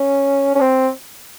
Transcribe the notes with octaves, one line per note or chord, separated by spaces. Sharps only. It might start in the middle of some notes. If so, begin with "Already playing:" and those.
Already playing: C#4
C#4
C4